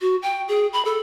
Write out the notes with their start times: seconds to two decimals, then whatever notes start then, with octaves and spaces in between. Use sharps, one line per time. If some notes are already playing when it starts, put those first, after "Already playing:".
0.01 F#4
0.22 G5
0.48 G#4
0.73 B5
0.85 A4